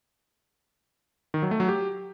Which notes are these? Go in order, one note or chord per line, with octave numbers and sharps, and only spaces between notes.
D#3
F#3
A3
F#3
G4